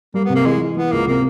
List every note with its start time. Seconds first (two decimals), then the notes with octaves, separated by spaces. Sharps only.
0.14 G3 A#3
0.25 B3
0.30 C3
0.35 A#3
0.45 E3 G#3
0.61 E3
0.77 E3 B3
0.92 C#2 A#3
1.07 C3 A#3